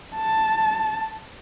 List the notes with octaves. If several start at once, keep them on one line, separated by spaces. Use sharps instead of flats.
A5